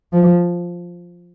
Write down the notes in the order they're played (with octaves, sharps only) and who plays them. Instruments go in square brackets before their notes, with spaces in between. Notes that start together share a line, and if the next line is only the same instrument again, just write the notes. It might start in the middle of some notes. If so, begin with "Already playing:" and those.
[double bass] F3